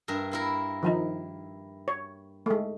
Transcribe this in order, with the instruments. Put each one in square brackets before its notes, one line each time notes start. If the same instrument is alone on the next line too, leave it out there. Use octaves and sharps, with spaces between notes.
[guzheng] G2 A#4 E5
A#3 E4 A#4
[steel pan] D#3 F3 D#4
C#5
G#3 A3